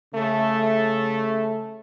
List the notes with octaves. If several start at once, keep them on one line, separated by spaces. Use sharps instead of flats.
C#3 A3